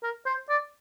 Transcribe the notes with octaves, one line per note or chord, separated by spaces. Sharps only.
A#4
C5
D5